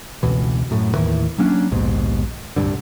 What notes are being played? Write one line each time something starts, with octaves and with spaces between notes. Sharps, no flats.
F1 C#2 B2 E3
F#2 A2
D#2 A2 D#3 E3
F#3 A#3 C#4 D4
A#1 D#2 G#2 B2
D1 C2 G2 D3